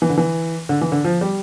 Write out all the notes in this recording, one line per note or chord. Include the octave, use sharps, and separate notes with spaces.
E3
D3
E3
D3
E3
D3
F3
G3